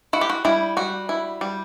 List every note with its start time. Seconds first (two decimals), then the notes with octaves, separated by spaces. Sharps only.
0.13 E4 F#4
0.21 G4
0.30 F#4
0.45 G3 E4
0.77 G3 F#4
1.09 E4
1.41 G3